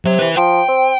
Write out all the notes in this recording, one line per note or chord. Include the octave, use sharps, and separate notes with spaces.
C3 F#3
E4 B4
F3 G5
C4